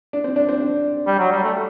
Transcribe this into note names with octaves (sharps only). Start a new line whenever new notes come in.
D4
C4
D4
C4
D4
G3
F#3
G3
A3